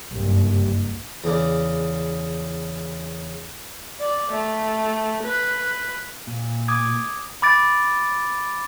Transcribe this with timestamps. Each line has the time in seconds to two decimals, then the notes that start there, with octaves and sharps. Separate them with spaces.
0.12 F#1 C2 G2
1.24 E2 C#3 D5
4.00 D5
4.31 A3
5.23 B4
6.27 A#2
6.68 D6 D#6 G#6
7.42 B5 D6 A6 D7